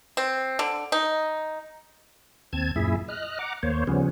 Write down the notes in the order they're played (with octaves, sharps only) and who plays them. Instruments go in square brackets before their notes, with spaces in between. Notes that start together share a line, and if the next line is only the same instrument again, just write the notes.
[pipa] C4
D3
D#4
[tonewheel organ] D#2 C4 A5 G#6
F#2 A#2 E4 G#4 E5
D#5 F6 F#6
F#5 A#5 D6
D#2 A#3 C5 C#5
C#3 F3 G3 B3 C#4